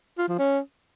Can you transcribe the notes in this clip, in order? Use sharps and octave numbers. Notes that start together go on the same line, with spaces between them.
F4
F3
C#4